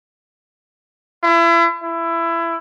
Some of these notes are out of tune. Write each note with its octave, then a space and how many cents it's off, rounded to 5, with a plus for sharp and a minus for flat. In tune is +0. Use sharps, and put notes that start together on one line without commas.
E4 +35
E4 +20